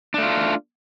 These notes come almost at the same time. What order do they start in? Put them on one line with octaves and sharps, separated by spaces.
D4 A3 F4